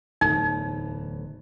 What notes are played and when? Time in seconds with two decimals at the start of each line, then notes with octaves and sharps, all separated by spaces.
0.21 D1 E2 D#4